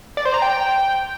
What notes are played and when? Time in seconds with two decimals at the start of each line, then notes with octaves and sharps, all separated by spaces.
0.17 D5
0.25 C5
0.34 A#5
0.42 G5